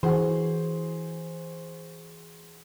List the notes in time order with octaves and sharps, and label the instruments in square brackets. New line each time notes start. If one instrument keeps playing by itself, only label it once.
[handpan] E3 [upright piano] F#4 G#4 C5